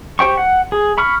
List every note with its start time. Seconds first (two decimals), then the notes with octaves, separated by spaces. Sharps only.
0.19 G4 C5 G5 C#6
0.37 F#5
0.72 G#4
0.98 B5 C#6 F6